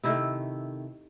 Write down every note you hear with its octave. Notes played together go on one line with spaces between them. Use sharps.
C3 D#3 A3 E4